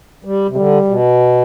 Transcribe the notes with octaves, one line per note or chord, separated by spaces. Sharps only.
G3
C3
D3 G3
B2